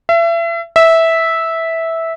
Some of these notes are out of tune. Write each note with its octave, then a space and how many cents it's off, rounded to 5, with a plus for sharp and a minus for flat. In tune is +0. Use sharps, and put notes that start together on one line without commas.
E5 +35
E5 -10